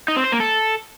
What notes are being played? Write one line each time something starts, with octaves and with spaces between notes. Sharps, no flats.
D#4
C4
C5
A#3
A4